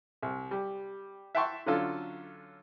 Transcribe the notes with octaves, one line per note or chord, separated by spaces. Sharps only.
C2
G3
E5 F#5 G5 A5 C6 C#6
D3 F#3 C#4 F4 A4